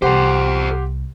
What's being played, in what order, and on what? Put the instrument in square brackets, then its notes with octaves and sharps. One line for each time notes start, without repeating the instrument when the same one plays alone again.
[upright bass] C2 [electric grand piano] G4 F#5 C6 [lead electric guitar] A4 C5